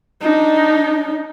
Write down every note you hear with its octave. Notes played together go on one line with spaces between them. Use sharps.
D4 D#4